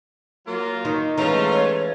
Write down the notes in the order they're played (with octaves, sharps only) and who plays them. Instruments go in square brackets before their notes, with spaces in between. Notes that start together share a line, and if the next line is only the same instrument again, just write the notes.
[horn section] F#3 A#3 F4
[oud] D#3
[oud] E3 G#3 [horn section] A3 C#4 F4 [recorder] A#5
[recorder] C#5